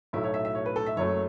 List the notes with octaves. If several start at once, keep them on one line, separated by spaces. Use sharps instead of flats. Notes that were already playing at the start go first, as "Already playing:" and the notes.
B1 A2 F#3 A3 E4
C#5
E5
E5
C#5
B4
A4
E5
F#1 F#2 F#3 A3 C#5